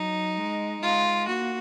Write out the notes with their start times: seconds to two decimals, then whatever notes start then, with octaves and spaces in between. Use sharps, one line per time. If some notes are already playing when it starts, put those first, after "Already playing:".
Already playing: F#3 D#4
0.37 G#3
0.82 G#3 F4
1.27 A#3 F#4